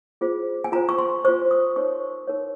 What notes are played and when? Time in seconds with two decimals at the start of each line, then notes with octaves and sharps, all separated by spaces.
0.21 F4 G#4 C5
0.64 G#5
0.72 F4 C5 A#5
0.89 C#6
0.98 C6
1.25 F4 C5 C#6
1.51 D#6
1.76 D#4 A#4 C#5 C#6
2.27 D#4 A#4 C#5